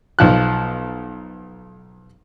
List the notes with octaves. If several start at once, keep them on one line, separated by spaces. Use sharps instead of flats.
B1 F3 F#6